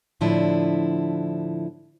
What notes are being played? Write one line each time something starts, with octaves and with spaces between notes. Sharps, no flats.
A2 D3 F3 D4 E4